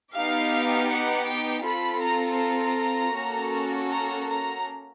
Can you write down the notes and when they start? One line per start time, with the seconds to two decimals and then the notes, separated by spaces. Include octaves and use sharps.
0.15 B3 D#4 G4 F5
0.90 F#5
1.27 G5
1.64 C4 F4 A4 B5
2.03 A#5
2.39 A#5
3.14 A#3 C#4 F#4 A4
3.90 A#5
4.27 A#5